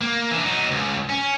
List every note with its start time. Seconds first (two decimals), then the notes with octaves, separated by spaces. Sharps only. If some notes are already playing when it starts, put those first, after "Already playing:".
0.01 A#3
0.31 E3 D4
0.43 F#3 D#4
0.71 C#2
1.09 C#4